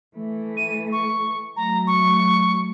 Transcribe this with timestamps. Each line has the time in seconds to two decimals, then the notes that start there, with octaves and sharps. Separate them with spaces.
0.16 E3 A3
0.57 D#7
0.92 C#6
1.56 F#3 A3 A#5
1.87 C#6